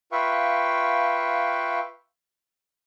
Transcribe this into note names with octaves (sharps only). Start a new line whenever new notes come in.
F4 B4 E5 F5 G5 C#6